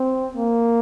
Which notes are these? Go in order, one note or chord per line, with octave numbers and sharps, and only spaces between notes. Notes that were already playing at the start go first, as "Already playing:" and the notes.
Already playing: C4
A#3